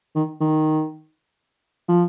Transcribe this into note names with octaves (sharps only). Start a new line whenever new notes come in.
D#3
D#3
F3